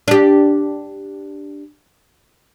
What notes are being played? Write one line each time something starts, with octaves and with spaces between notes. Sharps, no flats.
D4 G4